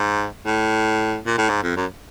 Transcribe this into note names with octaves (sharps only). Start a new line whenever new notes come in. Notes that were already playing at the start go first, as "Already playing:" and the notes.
Already playing: G#2
A2
A#2
A2
G#2
F2
F#2